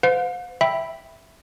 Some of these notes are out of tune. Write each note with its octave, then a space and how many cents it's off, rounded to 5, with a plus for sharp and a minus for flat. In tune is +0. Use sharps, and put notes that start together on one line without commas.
C5 -40 F5 +45
E5 +0 G5 +0 B5 +0